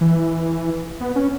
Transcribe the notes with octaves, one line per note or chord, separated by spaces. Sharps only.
E3
B3
C#4